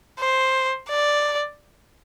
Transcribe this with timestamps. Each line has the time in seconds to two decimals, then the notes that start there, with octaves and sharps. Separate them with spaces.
0.20 C5
0.89 D5